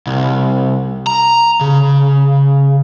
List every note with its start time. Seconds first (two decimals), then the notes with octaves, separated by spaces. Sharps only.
0.07 C2
1.07 A#5
1.61 C#3